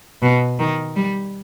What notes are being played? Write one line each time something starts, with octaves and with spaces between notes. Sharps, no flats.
B2
D#3
G3